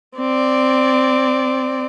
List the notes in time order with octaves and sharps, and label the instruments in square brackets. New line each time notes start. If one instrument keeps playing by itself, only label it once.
[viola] C4 D5